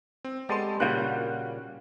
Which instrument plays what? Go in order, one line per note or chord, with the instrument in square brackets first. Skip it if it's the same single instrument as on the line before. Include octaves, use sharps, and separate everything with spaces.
[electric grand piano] C4
[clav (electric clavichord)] G#3 B3 D5 [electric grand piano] G4 A5 C6 [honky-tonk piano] A4
[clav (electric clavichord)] A#2 C#3 G3 [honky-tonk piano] A#3 F4 F#4 [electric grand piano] F#6 G6